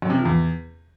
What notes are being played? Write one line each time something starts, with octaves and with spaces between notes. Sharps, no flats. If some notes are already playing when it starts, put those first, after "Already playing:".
F#2
C3
F3
E2